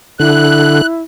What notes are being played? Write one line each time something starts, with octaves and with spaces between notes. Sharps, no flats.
D3 E4 F#6